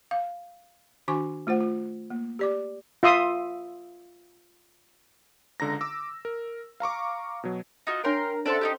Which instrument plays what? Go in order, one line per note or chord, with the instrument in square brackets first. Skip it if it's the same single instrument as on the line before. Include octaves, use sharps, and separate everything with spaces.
[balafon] F5
D#3 D4 F#4 G#5 C#6 D6
A3 F4 C5 F#5
F4
A#3
G4 D5 D6
[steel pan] F4 E5 C6 D#6
[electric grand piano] C#2 D3 A#5 A#6
D6 E6
A#4
F5 A#5 C#6 D6
B2 F#3
[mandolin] D#4 F4 F#4
[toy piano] D4 C#5 E5 [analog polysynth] A#4 [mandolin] G5 C6
[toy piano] C#4 C5 C6 [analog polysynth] A4 [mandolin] D5 E5 F#5
[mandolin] D#4 E4 G4